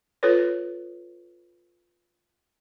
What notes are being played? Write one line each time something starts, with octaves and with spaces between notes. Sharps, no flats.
F4 A4 B4 C#5